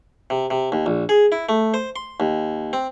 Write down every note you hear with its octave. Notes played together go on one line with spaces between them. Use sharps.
C3
C3
D#2
A#1
G#4
E4
A3
C5
C6
D#2
C4